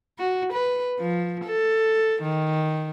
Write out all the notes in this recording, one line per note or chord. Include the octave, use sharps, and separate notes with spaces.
F#4
B4
F3
A4
D#3